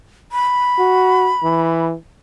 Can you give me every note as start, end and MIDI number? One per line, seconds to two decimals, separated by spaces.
0.32 1.84 83
0.79 1.31 66
1.43 1.94 52